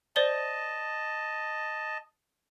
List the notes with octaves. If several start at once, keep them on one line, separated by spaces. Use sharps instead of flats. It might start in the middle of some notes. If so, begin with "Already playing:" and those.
C5 D5 D#5 A5 G7